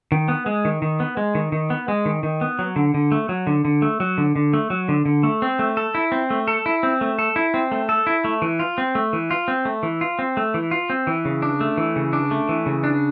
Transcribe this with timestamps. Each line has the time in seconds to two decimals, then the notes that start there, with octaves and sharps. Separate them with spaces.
0.12 D#3
0.28 B3
0.46 G#3
0.65 D#3
0.82 D#3
1.00 B3
1.17 G#3
1.35 D#3
1.52 D#3
1.70 B3
1.88 G#3
2.05 D#3
2.23 D#3
2.41 B3
2.59 F#3
2.76 D3
2.94 D3
3.12 A3
3.29 F#3
3.47 D3
3.65 D3
3.82 A3
4.00 F#3
4.18 D3
4.36 D3
4.53 A3
4.70 F#3
4.89 D3
5.06 D3
5.23 A3
5.42 C4
5.59 A3
5.77 A4
5.95 E4
6.12 C4
6.30 A3
6.48 A4
6.66 E4
6.83 C4
7.01 A3
7.19 A4
7.36 E4
7.54 C4
7.72 A3
7.89 A4
8.07 E4
8.24 A3
8.42 E3
8.60 F4
8.78 C4
8.95 A3
9.13 E3
9.31 F4
9.48 C4
9.65 A3
9.83 E3
10.01 F4
10.19 C4
10.37 A3
10.54 E3
10.71 F4
10.90 C4
11.07 E3
11.25 C#3
11.42 D4
11.61 A3
11.78 E3
11.96 C#3
12.13 D4
12.31 A3
12.49 E3
12.66 C#3
12.84 D4